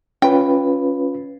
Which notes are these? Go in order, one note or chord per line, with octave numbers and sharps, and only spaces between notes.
C#4 F4 B4 G5